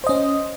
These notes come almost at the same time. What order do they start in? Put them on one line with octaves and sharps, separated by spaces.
C5 D#5 C#4